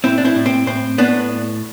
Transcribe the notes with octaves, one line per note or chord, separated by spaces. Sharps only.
A2 C4 E4
D4
C4 E4
A2
C4
A2 C4
A2 B3 D4